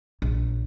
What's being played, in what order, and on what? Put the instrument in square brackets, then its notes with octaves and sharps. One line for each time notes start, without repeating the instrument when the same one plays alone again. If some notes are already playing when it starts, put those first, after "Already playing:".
[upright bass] A#1